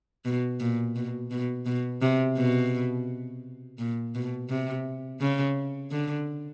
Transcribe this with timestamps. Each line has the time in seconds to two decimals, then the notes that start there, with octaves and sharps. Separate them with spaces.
0.25 B2
0.60 A#2
0.96 B2
1.31 B2
1.66 B2
2.02 C3
2.37 B2
3.78 A#2
4.15 B2
4.49 C3
5.21 C#3
5.91 D3